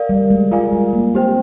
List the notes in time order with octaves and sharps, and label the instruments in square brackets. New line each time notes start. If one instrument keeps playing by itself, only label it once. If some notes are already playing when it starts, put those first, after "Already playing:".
Already playing: [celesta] A#4 D5 F5
[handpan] G3
G#3
[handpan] G3 [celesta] F4 A#4 D5 F5 G#5
[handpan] G#3
A#3
[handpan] C4 [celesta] G4 C5 G5